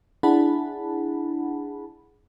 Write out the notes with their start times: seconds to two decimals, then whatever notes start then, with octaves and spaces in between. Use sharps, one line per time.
0.23 D4 E4 G#4 F#5 A5 B5